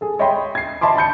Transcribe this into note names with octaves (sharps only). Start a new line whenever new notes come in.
G#4 A4
C#5 D#5 E5 G5 B5 C6
G#6 C7
D#5 E5 A5 B5 C6 D6
A5 B5 G6 C#7